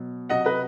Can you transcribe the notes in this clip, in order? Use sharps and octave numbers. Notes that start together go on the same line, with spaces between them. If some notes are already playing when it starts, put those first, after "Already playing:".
Already playing: B2 F#3
C3 F#3 D#5 F#5
B4 D#5